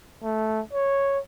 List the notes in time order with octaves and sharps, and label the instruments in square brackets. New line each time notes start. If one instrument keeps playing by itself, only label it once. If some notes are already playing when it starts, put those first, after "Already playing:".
[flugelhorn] A3
C#5